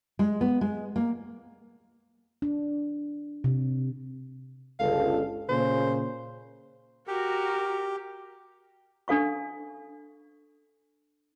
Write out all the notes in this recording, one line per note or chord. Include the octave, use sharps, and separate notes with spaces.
G#3
B3
G#3
A#3
D4
C3
G1 C#2 A4 F5
A#2 C#3 C5
F#4 G4 A#4
D4 A4 F5 C#6